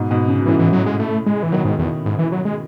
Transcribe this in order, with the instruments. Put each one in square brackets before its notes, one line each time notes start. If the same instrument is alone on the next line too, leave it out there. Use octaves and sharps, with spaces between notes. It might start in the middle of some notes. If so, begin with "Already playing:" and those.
Already playing: [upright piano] G#2 B2
G#2 B2
C#3
B2
[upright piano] A2 C#3 [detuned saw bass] E3
[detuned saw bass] E3
F#3
G#3
A3
G#3
E3
[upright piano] B2 D#3 [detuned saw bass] F#3
[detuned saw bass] G#2
E2
G#2
E3
F#3
G#3